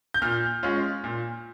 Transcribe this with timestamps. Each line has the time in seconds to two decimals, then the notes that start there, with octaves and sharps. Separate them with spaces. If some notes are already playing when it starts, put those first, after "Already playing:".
0.14 G6
0.22 A#2 F6
0.63 G#3 C#4 F4
1.04 A#2